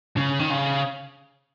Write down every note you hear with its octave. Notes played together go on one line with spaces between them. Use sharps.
C#3
D#3
C#3